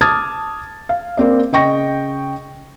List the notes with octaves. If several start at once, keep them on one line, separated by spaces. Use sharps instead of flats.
A5 D6 D#6 F6 G#6 A6
F5
A#3 C4 D5
C#3 D#5 G5 C#6 A#6